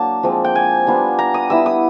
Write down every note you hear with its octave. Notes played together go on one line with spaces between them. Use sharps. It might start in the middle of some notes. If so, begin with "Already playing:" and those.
Already playing: F#3 A#3 D4 A5
F3 G#3 C4
G5
G#5
G3 B3 D4 F4
A#5
D#6
G3 B3 E4 E6
D#6